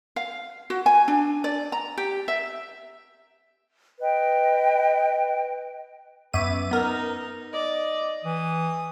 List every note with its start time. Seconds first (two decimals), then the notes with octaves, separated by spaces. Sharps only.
0.16 F5
0.70 F#4
0.86 G#5
1.08 D4
1.44 D5
1.72 A#5
1.97 G4
2.28 E5
4.00 B4 D#5 G5
6.34 F#2 B3 E5 D6 D#7
6.71 B3 D#4 A#4 A#5
7.53 D5 D#5
8.25 E3 D#6